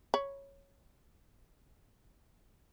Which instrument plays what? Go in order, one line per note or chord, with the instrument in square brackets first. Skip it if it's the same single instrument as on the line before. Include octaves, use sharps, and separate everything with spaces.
[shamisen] C#5 B5